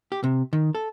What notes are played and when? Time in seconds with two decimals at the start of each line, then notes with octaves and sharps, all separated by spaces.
0.12 G4
0.24 C3
0.53 D#3
0.75 A4